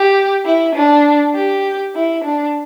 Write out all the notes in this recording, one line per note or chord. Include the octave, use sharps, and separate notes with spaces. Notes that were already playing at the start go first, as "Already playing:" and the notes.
Already playing: G4
E4
D4
G4
E4
D4